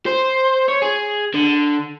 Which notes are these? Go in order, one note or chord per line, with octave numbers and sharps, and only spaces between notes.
C5
C#5
G#4
D3